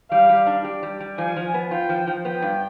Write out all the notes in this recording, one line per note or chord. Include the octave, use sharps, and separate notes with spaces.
G3 F5
G3
D4
G4
G3
G3
F3 G#5
F3
B3
F4 G5
F3
F3
B3 G5
G2